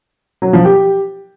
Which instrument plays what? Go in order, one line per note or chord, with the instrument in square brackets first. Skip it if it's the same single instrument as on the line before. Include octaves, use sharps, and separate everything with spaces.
[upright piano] F#3
F3
G4